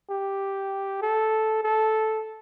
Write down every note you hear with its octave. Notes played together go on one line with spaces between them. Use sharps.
G4
A4
A4